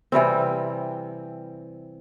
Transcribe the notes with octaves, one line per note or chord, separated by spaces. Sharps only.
C3 E3 G3 C4